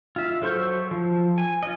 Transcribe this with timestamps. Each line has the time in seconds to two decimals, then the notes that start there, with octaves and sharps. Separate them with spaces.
0.16 F4 E5
0.42 F#3 A4 C5 C#6 G6
0.91 F3
1.38 G#5
1.63 F4 D#5